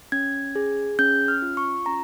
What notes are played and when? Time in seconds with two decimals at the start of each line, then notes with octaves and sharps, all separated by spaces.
0.12 C#4 G#6
0.55 G#4
0.99 C#4 G6
1.28 F6
1.42 F4
1.57 C#6
1.86 C#4 A#5